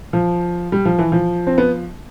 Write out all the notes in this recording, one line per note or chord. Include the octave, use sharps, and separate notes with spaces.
F3
G3
F3
E3
F3
C4
B3